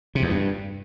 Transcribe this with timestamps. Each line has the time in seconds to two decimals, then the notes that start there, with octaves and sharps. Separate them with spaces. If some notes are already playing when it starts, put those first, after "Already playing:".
0.15 C3
0.22 E2
0.29 G2